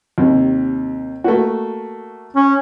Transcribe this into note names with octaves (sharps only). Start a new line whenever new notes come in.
D#2 C3
A3 A#3 F#4
C#4